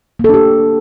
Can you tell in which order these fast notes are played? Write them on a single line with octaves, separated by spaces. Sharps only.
A#3 A4 D4 G4